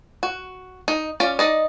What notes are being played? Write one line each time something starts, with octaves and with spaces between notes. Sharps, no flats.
F#4
D#4
C#4 F4 D5
D#4 D5 D#5